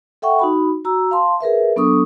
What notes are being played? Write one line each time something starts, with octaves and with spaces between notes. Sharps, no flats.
A4 E5 F#5 G5 C#6
D#4 F#4 B5
F#4 A#5 E6
F5 A5 C6
G#4 A#4 B4 E5
F#3 B3 D4 A4 C#6 D#6